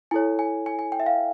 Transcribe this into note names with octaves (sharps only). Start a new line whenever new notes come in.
E4 A4 C#5 G#5
G#5
G#5
G#5
G5
E5
F5